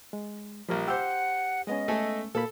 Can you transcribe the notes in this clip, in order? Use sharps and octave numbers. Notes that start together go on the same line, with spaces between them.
G#3
A#1 F3 G3 A#4
G4 C5 F#5 E6 G6
G#3 B3 C#4 D#5
A3 A4 G#5
A#2 A#3 A4 B5